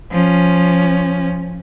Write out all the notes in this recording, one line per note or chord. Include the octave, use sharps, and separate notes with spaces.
F3 C#4